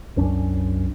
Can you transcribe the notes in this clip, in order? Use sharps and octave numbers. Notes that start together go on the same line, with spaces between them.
C2 F#2 C#4 D4